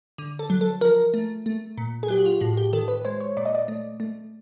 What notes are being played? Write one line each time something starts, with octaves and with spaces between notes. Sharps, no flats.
D3
A4
F#3
A4
F3 A#4
A3
A3
A#2
G#4
F#3 G4
F#4
F4
A2 F#4
G4
D#3 A4
B4
G#3 C5
C#5
A#2 D5
D#5
D5
A3
A3